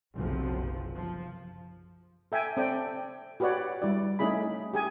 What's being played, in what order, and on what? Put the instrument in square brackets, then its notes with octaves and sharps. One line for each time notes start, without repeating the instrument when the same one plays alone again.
[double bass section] F#1 B1 F#2 C3 F3
F3
[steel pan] A4 E5 G5 G#5
C4 A4 D5 G5
F#4 G4 B4 C#5 D5 F#5
G3 E4 D5
A3 C#4 D#4 E4 G#4 B5
G4 G#4 G#5